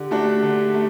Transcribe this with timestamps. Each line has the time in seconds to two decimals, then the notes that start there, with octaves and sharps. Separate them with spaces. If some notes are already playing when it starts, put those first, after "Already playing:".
Already playing: D3 G4
0.11 A3 D4 F#4
0.43 D3
0.74 A3